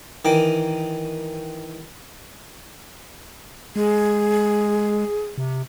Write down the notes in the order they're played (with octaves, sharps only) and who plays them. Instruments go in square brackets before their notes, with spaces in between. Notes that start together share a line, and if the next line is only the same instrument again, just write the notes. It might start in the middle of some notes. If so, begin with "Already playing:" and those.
[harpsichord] D#3 E3 D6
[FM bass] G#3 [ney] G#4
[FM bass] C3